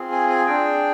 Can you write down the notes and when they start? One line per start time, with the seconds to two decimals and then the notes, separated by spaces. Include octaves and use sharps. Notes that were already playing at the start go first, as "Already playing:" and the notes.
Already playing: C4 F4 G#4
0.12 G#5
0.30 G#5
0.46 D4 G#4 G5